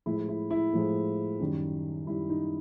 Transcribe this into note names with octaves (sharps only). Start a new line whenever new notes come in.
A2 F3 G#3 E4
E4
E4
A2 F3 G#3
F#2 D#3 G3
F#2 D#3 G3 E4
D#4